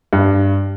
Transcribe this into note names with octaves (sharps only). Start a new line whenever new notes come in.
G2